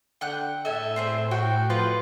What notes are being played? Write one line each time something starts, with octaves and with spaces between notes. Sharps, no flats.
D3 F#5 G5 F#6
A2 A4 E5 G#5
C4 G#4 C5
F#4 G5
F3 F4 B4 C6